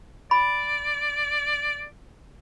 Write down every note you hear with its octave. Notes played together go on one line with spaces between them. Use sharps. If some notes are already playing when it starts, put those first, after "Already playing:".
D5 B5